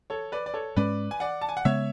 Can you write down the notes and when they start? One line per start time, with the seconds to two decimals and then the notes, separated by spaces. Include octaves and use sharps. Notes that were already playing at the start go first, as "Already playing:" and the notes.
0.10 A4 C#5
0.32 B4 D5
0.46 D5
0.54 A4 C#5
0.76 G#2 G#3 C#4 B4 D5
1.11 G#5
1.20 D5 F#5
1.41 A5
1.49 G#5
1.57 F#5
1.65 C#3 G#3 B3 C#5 E5